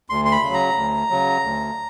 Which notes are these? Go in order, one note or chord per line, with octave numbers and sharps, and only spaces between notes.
D2 C6
C6
B5
C#3
F#3
A#5
D2
C#3 F#3
D2